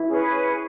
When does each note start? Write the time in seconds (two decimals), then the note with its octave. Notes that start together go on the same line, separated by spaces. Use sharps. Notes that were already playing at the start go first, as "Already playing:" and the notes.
Already playing: E4
0.09 C#4 G#4 B4